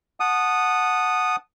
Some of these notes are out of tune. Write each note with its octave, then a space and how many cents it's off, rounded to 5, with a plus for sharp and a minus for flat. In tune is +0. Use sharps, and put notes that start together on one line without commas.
F#5 -10 A5 -15 D#6 -10